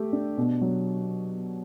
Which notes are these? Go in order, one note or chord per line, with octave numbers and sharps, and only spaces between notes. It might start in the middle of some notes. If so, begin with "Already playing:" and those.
Already playing: A3 G4
D4
B2
F#3